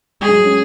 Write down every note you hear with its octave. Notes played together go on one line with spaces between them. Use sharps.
G#3 G#4
F#3
G#3
C#4